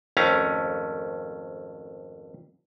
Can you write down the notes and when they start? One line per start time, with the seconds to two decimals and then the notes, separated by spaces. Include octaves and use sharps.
0.17 G#1 F2 A3 C#4 F5 A#5